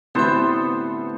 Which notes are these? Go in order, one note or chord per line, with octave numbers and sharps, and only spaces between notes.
A1 D2 B3 C4 E4 A4 C5 E5